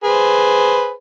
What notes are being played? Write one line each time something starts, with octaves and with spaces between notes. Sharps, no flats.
G#4 B4 C5